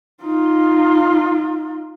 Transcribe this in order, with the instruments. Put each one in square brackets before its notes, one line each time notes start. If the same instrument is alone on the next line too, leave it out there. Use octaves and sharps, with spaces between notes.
[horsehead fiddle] D#4 F4